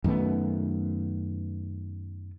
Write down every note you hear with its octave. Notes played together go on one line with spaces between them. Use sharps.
F#2 D#3 A3 B3